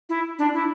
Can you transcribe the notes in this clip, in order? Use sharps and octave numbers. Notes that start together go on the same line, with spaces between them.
E4
D4
E4